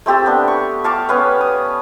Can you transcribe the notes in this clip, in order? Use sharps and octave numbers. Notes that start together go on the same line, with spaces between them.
A3 C4 G4 A4
B3 D4
C#6
F5 A5 C#6 D6
B3 C#4 B4 F5
D#6